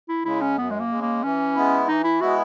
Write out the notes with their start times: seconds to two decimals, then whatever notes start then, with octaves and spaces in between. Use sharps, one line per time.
0.09 E4
0.25 C#3 G#3 E4
0.41 C#4
0.58 F#2 B3
0.70 G#3
0.80 A#3
0.91 C#3 G#3
1.02 A#3
1.23 E3 C#4
1.55 G#3 B3 E4
1.88 E3 D#4
2.04 E4
2.21 G#3 B3 E4 F#4